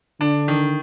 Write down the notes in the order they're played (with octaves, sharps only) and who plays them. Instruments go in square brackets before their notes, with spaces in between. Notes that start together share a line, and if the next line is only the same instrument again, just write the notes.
[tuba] D3 [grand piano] D4
[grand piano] D#3